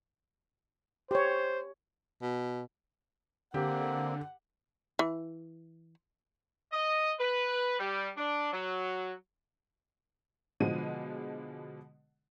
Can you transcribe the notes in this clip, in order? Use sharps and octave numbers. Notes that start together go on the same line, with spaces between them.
G4 C5 C#5
B2
D3 A#3 C4 G4 F#5
E3
D#5
B4
G3
D4
F#3
B2 D3 F3 G#3 D#7